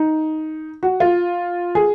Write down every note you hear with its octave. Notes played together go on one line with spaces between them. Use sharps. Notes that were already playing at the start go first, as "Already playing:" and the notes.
Already playing: D#4
F#4
F4
G#4